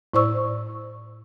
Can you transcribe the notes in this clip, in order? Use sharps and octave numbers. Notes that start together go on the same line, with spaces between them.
A2 E4 C5 D5 C#6 E6